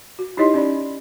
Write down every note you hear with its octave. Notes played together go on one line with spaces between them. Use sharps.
F#4
D#4 E4 G4 C#5 D#5 C6
C#4 D5 B5